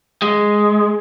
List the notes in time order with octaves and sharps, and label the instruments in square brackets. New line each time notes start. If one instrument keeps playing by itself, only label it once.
[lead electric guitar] G#3